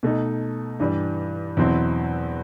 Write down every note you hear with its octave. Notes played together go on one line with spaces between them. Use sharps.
B2 A3 D#4
G2 E3 G3
E2 B2 F#3 C4 E4